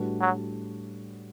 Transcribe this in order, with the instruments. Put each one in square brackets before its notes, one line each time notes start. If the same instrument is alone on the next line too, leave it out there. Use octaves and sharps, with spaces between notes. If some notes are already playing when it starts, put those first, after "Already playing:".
Already playing: [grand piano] A2 G3 D4 F#4 B4
[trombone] F#3